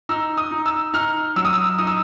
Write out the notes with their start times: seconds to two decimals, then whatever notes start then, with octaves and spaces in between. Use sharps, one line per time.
0.09 D#4 E6
0.37 D#6
0.51 D#4
0.66 E6
0.93 D#4 F6
1.36 F#3 E6
1.45 D#6
1.53 E6
1.78 D#4 D#6
1.87 E6